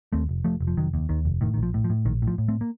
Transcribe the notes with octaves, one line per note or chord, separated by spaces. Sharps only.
D#2 A3 C4
F1
F1 F3 A3
F1
F3
F1 D#3 F#3
D#2
D#2 D#3
F1
A2 D#3
D#3
A#1
F3
A2
F3
A2
A#1 D#3
A2
F3
A2
A3 C4
A#3